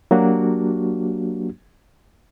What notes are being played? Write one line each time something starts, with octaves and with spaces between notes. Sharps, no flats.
F#3 A#3 D4 F#4 G4